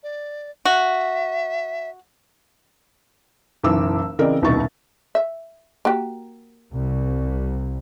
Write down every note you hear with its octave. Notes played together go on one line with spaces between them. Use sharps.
D5
F#4 E5
F#1 B1 E3 D6 E6
C#3 E3 C4 A#4 D5 D#5
D#1 C2 B2 D#3 C#6 A6
E5
A#3 F#4 G4
C2